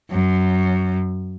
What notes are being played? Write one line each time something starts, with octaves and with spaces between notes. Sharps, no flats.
F#2